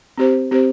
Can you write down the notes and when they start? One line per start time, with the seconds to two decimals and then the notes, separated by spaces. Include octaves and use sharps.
0.18 C4 G4 C5
0.51 C4 G4 C5